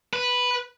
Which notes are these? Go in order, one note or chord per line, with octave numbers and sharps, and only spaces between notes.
B4